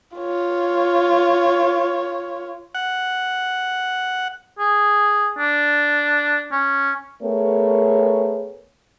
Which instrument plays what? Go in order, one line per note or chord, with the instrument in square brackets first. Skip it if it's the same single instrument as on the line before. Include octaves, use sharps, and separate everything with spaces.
[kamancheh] F4 C#5
[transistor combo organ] F#5
[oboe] G#4
D4
C#4
[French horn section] A3 B3 G#4 A#4 C#5